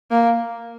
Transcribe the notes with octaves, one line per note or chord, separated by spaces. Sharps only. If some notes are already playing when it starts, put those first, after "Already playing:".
A#3